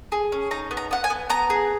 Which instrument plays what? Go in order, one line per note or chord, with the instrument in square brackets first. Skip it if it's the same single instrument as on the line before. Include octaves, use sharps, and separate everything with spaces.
[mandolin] G#4
C#4
D#4 A#5
B3
A#5
B3 F#5
G#5
B3
B3 A#5
G#4